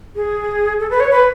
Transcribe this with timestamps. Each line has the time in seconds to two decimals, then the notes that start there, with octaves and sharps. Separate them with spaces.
0.16 G#4
0.80 A4
0.91 B4
1.00 C#5
1.11 B4